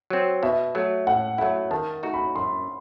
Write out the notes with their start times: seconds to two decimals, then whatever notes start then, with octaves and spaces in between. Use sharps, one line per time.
0.10 F#3 C4
0.43 B2 E5
0.75 F#3 A3
1.07 A2 F#5
1.38 F#3 A3 E4 F#5
1.71 D#3 A5
2.03 A3 D#4 F#4
2.14 B5
2.35 F#2 C6